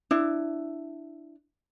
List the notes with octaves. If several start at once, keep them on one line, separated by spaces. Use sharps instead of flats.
D4 E4